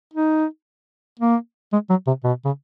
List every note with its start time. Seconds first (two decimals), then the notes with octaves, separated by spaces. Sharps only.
0.14 D#4
1.20 A#3
1.73 G#3
1.90 F#3
2.07 C3
2.24 B2
2.45 C#3